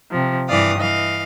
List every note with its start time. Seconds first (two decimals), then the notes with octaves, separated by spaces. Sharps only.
0.12 C3 F3
0.48 G2 E3 D5 F5 D#6
0.78 E3 D#5 F5